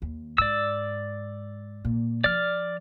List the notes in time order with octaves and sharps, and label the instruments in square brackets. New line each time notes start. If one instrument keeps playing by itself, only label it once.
[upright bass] D#2
[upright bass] G#2 [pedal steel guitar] D5 E6
[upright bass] A#2
[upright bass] F3 [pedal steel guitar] D5 F6